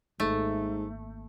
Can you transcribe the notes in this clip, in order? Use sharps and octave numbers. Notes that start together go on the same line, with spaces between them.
G#1 G#2 A3 A#3